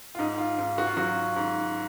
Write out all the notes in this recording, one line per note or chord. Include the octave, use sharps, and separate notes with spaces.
F4
G#2 D#4
F4
G#2
F#4
F4
F#3 F#4
G#2